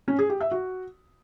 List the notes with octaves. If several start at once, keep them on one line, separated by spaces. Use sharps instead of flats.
C#4
G#4
G4
E5
F#4